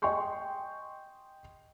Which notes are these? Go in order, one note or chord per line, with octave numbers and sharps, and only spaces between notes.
D#5 G5 G#5 C6 C#6 G6